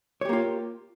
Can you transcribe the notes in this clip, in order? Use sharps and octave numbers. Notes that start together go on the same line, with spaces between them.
A#3 F4 G4 C#5